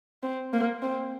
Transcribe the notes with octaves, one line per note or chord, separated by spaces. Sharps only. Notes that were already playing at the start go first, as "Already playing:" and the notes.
C4
A#3
C4